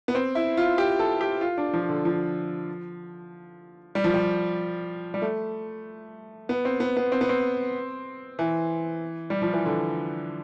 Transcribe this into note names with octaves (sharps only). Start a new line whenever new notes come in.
B3
C4
E4
F4
G4
A4
G4
F4
D4
F3
D3
F3
G3
F3
G3
G3
A3
B3
C4
B3
B3
C4
B3
C4
E3
G3
F3
E3
D3